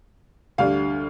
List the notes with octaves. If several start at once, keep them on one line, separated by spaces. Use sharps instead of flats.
D2 D3 G3 D4 F5